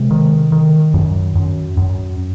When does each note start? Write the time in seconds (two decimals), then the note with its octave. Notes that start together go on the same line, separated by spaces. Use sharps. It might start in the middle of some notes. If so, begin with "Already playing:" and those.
Already playing: C3 G#3
0.11 D#3
0.52 D#3
0.94 F#2
1.36 F#2
1.77 F#2